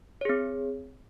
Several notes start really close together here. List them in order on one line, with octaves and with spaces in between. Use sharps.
C#5 G#4 C4